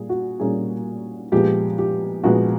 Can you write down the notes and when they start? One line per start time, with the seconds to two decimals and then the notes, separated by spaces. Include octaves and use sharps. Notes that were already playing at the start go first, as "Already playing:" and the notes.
Already playing: A#2 G3 A#3 G#4
0.09 F#4
0.40 A#2 G3 A#3 C#4 G#4
1.32 A#2 F3 G#3 B3 G4
1.79 G4
2.24 A#2 F3 G#3 B3 F#4